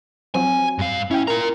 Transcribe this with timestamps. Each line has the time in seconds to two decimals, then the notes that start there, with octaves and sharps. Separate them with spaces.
0.34 F3 F#3 C4 G#5
0.79 G2 F5
1.11 C#4 E4 G5
1.27 F4 A#4 A#5